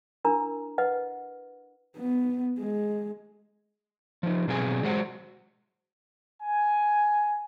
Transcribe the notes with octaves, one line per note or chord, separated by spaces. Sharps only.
D4 E4 A#4 A#5
B4 D#5 F#5
B3
G#3
F3 D#4
B2 F#3 C4 G#4 G#5
F#3 G#3 F#4 C5 F#5
G#5